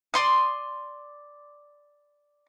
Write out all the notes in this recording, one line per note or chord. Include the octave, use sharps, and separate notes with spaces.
D5 C6 D#6